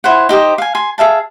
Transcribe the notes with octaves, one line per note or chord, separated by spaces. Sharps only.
E4 C5 C#5 F#5
D#4 G4 C5 D#5
F5 G#5
G#5 C6
G#4 E5 F5 A5